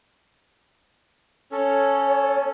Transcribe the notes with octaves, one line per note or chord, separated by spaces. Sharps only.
C#4 A4 C#5